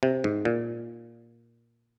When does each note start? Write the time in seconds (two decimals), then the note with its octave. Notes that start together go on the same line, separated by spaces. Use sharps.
0.03 C3
0.24 G#2
0.45 A#2